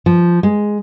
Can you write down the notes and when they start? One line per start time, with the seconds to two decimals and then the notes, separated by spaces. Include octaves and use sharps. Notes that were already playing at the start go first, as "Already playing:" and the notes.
0.06 F3
0.43 G#3